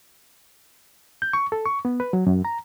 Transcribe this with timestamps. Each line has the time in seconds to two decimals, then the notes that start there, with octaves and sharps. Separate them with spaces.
1.22 G6
1.33 C#6
1.52 A4
1.66 C#6
1.85 B3
2.00 B4
2.13 F#3
2.27 F#2
2.45 A#5